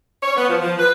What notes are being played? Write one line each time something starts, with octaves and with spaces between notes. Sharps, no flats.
C#5
B3
F3
F3
B4